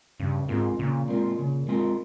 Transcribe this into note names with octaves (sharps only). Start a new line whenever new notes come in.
G2 C#3
G#2 G#3 C4 F4 A#4
A#2 C#3
G#3 C4 F4 A#4
C#3
G#3 C4 F4 A#4